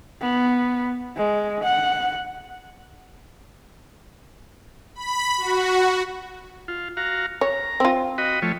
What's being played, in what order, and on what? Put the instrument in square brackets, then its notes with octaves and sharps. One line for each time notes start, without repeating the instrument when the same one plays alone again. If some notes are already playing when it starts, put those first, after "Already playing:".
[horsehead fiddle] B3
G#3
F#5
[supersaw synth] B5
F#4
[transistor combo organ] F4
F#4 F5 A#5
[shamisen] C#5 [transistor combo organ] A#5
[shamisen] C4 F4
[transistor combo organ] F#4 D#5 B5
F3 A3 C#5